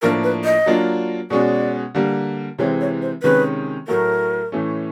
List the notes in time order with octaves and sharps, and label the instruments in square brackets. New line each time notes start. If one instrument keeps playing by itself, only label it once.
[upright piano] A2 F3 A#3 D4 [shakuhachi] A#4
[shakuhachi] B4
D#5
[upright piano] F#3 A#3 D4 F4
[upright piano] B2 G#3 C#4 F#4 [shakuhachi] D5
[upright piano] D3 G3 A#3
[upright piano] C3 E3 G#3 C4 [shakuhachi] C#5
[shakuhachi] C#5
C5
[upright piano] C3 D#3 G#3 C#4 [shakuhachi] B4
[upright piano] A2 F#3 A3 [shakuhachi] A#4
[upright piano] A2 E3 A3 C#4